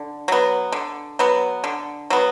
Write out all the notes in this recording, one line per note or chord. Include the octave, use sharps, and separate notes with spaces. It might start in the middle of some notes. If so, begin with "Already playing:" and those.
Already playing: D3
F#3 B3
D3
F#3 B3
D3
F#3 B3